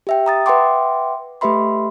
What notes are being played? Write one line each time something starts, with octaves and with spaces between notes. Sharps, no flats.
G4 E5 G5
A#5 D#6 A6
B4 E5 F#5 G5 C6 D6
A3 G4 B4 E5 B5 C6